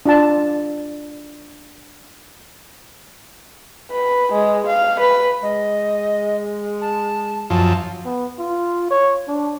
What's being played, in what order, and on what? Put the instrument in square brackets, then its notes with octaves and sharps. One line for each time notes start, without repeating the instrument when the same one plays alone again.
[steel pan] D4 F4 A5
[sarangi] B4
G#3
F5
B4
[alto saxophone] G#3 [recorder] D#5
[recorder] A5
[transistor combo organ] F#2 F3 [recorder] A5
[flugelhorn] B3
F4
C#5
D4